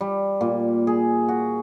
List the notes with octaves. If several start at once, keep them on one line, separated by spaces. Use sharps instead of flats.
G3
A#2
G#4
F#4